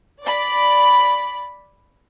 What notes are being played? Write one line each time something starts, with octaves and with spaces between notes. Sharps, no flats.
D5 B5